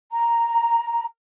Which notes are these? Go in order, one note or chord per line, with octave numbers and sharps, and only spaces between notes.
A#5